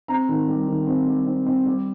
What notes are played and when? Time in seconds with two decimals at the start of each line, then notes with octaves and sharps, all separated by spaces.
0.08 C4 A#5
0.29 D#3
0.48 G3
0.68 D#3
0.87 C4
1.07 G3
1.26 C4
1.46 C4
1.66 G3